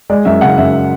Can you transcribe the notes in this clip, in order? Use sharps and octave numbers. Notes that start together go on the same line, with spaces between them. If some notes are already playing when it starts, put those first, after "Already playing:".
G#3 D5
F#2 E5
C#3 F#5
F#2 E5